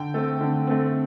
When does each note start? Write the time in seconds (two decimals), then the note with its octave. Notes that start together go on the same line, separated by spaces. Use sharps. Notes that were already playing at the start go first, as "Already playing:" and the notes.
Already playing: D3 G5
0.14 A3 C4
0.41 D3
0.67 A3 C4